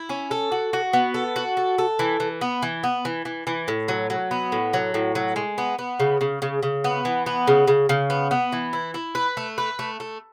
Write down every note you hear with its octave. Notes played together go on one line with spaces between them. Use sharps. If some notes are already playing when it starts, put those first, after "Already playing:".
Already playing: E4
C#4
A4
F#4
F#4
B3
A4
F#4
A4
A4
E3
E3
B3
E3
B3
E3
E3
E3
A2
F#3
F#3
B3
A2
F#3
A2
F#3
G#3
B3
B3
C#3
C#3
C#3
C#3
B3
E3
B3
C#3
C#3
C#3
B3
B3
E3
E4
E4
B4
A3
B4
A3
A3